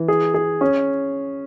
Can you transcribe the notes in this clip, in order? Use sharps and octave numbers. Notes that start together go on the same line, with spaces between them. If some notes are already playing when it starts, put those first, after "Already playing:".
Already playing: E3
G#4
G#4
C#4